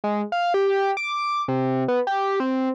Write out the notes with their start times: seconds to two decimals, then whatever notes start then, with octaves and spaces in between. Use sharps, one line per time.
0.04 G#3
0.32 F5
0.54 G4
0.97 D6
1.48 C3
1.88 B3
2.07 G4
2.40 C4